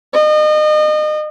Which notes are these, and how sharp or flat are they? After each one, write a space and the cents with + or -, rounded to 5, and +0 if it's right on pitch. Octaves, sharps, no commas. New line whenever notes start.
D#5 -35